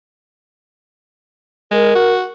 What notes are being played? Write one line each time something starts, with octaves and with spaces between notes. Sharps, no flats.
G#3 A#4
F#4